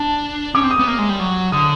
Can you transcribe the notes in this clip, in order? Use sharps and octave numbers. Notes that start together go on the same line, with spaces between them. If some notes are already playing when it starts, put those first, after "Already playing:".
Already playing: D4 A5
C#4 D6
C4
D#6
B3
A#3 D#6
G#3
G3
F#3
D3 D#6